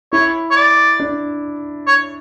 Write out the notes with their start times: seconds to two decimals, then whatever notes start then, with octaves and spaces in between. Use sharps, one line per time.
0.12 E4 C#5
0.51 C#5
0.56 D5
1.00 D4
1.87 C#5